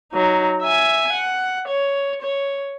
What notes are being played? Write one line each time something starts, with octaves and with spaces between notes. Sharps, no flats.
F#3 D#4
E5 G#5
F#5
C#5
C#5